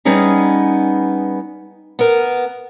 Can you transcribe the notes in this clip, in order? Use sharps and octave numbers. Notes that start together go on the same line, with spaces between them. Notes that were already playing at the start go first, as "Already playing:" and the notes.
G3 B3 C#4 D#4 G#4
B3 A#4